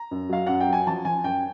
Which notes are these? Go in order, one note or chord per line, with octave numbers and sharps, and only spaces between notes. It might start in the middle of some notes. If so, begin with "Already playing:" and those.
Already playing: A#5
F#2
F#3 F5
F#2 F#5
G5
F#3 G#5
F3 A5
F3 G#5
F#2 G5